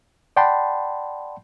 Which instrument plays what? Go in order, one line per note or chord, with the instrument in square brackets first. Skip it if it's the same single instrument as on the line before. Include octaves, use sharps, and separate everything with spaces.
[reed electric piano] D5 F#5 G5 A5 B5 C6